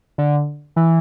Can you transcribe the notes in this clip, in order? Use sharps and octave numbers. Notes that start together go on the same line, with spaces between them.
D3
E3